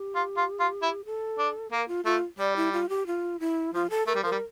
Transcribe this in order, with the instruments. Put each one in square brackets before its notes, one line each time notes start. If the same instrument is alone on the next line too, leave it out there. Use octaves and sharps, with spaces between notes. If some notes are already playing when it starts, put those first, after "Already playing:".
Already playing: [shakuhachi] G4
[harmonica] F4
F4
F4
E4
[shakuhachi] A4
[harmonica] D4
[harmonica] A#3 [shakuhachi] A#4
[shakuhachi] F4
[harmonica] A3 [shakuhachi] F4
[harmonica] G3 [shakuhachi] D5
[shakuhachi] E4
F4
G4
F4
E4
[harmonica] F3 [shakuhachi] F4
[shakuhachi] A4
[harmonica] A3 [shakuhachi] A#4
[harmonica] G3
[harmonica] F3 [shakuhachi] A#4
[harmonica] G3